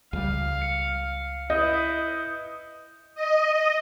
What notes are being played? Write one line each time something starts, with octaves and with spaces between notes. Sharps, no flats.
C#2 G3 F5
C#7
E4 B4 D#5 D#6 G6
D#5